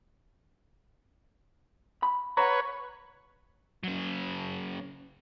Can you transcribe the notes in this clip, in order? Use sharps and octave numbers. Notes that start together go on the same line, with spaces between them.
B5
B4 C#5 F#5 A5 A#5
C#3 F#3